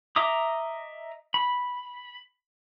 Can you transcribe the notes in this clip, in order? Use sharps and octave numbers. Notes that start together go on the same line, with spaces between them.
D#5 E5 A#5 D6 D#6
B5